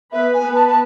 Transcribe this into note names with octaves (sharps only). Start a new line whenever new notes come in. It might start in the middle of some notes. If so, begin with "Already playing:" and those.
B3 B4 E5
G#5
B3 B4
A5
A5